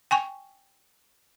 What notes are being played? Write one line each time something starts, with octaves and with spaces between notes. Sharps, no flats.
G5 G#5 C#6